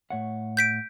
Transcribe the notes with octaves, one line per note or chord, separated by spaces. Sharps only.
A2 C#5 F#5
G6 B6 D7